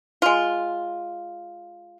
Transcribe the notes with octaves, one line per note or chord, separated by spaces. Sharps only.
G#3 F4